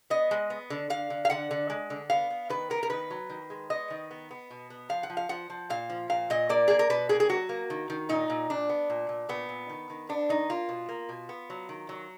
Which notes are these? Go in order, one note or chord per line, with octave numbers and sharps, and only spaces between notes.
B3 D#5
G#3
B3
D3
D3 F5
D3
F5
D3 F#5
D3
G#3
D3
B3 F5
B3
D#3 B4
B3 A#4
A#4
D#3 B4
F#3
D#3
G#3
B3 D#5
D#3
B3
B3
B2
B3
F3 F5
F#5
F3
F5
F3 F#5
F3
A#2 F5
F3
A#2 F5
A#2 D#5
A#3 D5
A#3 G#4
A#4
B2 B4
A#3 G#4
G#4
F#3 F#4
A#3
D#3
D#3
A#2 D#4
A#2
A#2 D4
B3
A#2
A#2
A#2 B3
A#2
D#3
D#3
B3 D4
D#3 D#4
A#3 F4
B2
A#3
B2
B3
F#3
D#3
F#3